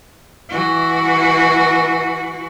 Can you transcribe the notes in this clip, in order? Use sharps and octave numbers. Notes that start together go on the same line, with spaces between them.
E3 F#4